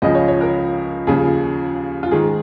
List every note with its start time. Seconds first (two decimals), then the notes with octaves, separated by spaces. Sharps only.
0.02 C#2 C#3 F3 D#5
0.15 C#5
0.28 C#5
0.41 A#4
1.07 D#2 C#3 F3 G#4
2.03 F4
2.11 G#2 D#3 G#4